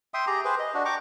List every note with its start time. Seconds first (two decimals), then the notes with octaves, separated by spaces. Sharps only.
0.14 E5 G5 C6 D#6
0.27 G4 G#4 A#5
0.45 G#4 B4 C5
0.59 D#5
0.74 D4 F#4
0.85 G5 A#5 C#6 D6